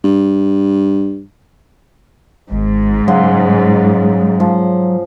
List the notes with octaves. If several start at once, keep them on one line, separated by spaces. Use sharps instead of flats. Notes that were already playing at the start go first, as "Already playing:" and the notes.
G2
G#1 G#2
C#3 F#3 F#5 C6
F3